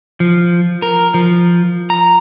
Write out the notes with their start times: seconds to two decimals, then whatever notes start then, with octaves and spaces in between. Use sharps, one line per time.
0.20 F3
0.82 A#4
1.14 F3
1.90 A#5